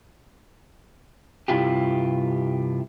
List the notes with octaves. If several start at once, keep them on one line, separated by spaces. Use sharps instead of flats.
G2 C3 E4 F4 G4